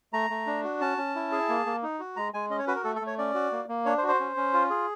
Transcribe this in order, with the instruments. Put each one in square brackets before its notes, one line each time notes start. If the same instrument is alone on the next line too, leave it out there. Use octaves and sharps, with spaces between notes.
[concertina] A3 A#5
A3
D4
F#4
C#4 A5
C#4
E4
G#4
A#3
A#3
D#4
F#4
G#3 A#5
G#3 G#5
C#4 D#5
C#5
F#4 B4
A#4
A3 A4
A4
A3
C#5
C#4 D5
F#4
A#3
A#3
D4 C#5
C5
F#4
C5
C#4
C#4
F4
G#4